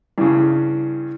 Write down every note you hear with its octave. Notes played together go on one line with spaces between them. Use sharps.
G2 C#3 E4